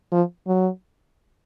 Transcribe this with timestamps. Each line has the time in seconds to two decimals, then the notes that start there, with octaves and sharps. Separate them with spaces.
0.12 F3
0.47 F#3